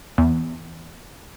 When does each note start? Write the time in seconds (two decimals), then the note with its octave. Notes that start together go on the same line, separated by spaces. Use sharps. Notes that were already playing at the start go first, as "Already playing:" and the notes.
0.18 E2